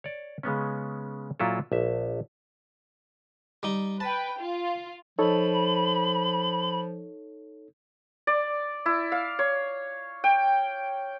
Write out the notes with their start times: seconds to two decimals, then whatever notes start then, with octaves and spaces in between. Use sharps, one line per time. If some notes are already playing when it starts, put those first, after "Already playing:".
0.04 C#5 D5
0.43 C#3 G#3 B3 C#4
1.40 A#2 F#3 E4 F4 A4
1.72 A#1 E5
3.63 G3 D#4
4.00 B4 G5 A5
4.40 F4
5.19 F3 D#4 A4 C#5 B5
8.27 D5
8.86 E4
9.12 F5
9.39 C#5
10.24 G5